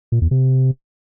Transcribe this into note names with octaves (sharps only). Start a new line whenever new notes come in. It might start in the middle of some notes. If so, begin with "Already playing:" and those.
A#2
E2
C3